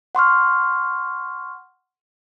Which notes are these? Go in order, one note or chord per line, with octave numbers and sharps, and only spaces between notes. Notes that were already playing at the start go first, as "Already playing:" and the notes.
F#5 C6 C#6 F6